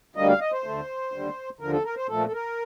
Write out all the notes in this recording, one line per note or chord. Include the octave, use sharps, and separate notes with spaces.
D2 D3 G3 A#3 D#5
F5
D#5
C5
D2 D3 A3
D#2 D3 G3
D#2 D3 F3 A#4
A4
A#4
C5
A#2 F3 A3 A4
A4
A#4